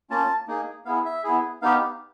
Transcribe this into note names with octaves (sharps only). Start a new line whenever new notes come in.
A#3 C#4 F4 A5
A#3 D#4 G#4
B3 E4 G#4 F5
E5
B3 E4 G#4
B3 D#4 G4 F5